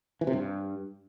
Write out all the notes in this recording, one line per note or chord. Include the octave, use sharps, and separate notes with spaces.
E3
C3
G2